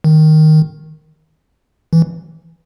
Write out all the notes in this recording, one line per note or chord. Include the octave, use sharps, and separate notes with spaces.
D#3
E3